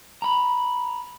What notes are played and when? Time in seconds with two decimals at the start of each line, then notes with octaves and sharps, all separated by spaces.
0.22 A#5 B5